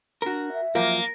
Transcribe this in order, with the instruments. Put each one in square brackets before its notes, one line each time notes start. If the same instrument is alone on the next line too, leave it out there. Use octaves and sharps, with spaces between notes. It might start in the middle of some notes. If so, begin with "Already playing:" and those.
[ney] D4 [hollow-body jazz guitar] F#4 A#4
[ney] E5
[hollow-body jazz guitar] F#2 F3 [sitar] A#3